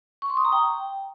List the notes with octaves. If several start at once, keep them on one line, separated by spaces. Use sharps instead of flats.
C#6
C6
D#6
A#5
G5